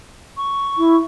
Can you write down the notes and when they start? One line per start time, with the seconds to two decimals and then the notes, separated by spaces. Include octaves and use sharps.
0.37 C#6
0.78 E4